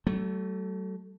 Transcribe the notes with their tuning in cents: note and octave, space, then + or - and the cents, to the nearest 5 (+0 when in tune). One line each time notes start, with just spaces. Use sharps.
F#3 +45 A3 +0